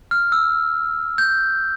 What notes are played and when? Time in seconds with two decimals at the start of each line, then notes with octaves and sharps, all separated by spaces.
0.11 F6
0.32 E6
1.18 G6